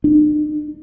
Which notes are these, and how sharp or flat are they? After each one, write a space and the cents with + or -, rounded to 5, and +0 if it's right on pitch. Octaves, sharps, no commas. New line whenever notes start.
D4 +45